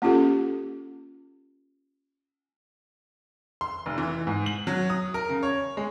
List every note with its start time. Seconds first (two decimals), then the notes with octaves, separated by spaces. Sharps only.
0.02 A#3 C#4 F4 G4 A4
3.61 C6
3.86 F1
3.98 E3
4.27 G#2
4.46 F#7
4.67 F#3
4.90 D#6
5.14 A#4
5.30 C#3
5.43 C#5
5.77 G#3